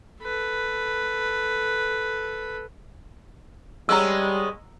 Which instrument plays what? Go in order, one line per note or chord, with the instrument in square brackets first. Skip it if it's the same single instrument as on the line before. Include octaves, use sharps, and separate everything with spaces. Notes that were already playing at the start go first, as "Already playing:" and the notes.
[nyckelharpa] A4 B4
[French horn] G3 [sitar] G#3 B3 C#4 [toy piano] A#5 E6